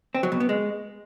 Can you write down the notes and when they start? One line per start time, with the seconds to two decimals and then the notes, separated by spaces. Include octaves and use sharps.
0.15 C4
0.23 F#3
0.32 B2
0.40 B3
0.49 G#3